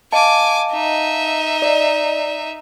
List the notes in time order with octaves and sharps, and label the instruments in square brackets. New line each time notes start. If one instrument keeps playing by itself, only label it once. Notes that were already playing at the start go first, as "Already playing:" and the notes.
[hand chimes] D#5 F5 A5 [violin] G#5 D6
[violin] D#4 E5
[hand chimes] D5 D#5